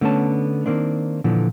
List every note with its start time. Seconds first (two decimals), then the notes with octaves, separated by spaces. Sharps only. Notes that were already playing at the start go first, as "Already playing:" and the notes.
0.01 D3 A3 B3 C#4 A5
0.66 D#3 A#3 C4 D4
1.24 A#2 D3 E3 F3